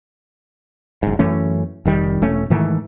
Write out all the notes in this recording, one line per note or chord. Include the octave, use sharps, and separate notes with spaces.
F#1 G#2
F#2 E3 A3 C#4
F1 D#3 G3
E1 A3 C#4
G#2 D#3 E3 A3